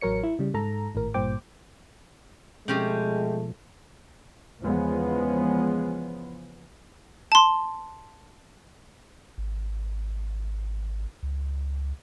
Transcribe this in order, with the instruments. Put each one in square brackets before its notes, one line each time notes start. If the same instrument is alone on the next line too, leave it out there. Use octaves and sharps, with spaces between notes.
[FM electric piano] A1 F#3 A#4 C#5 C#7
E4
C#3 G3
G#2 A4 A#5
G#1 A2 A#4
G#1 G2 A#2 C5 G5 D6
[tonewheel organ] B2 F3 [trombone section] G#3 A3 [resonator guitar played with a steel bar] C4 C#4 G4
[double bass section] E2 C#3 F3 G#3 B3
[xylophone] A5 C6
[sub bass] G#1
C#2